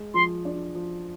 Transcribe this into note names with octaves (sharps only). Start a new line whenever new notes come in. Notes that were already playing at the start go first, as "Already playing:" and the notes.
Already playing: G#3
F3 C6
D4
F3